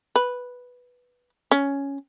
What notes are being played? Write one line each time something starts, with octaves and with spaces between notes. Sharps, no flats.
B4
C#4